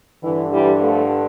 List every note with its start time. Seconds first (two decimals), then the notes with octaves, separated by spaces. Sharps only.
0.23 G2 D3 E3
0.53 E3 G3
0.81 F3 A3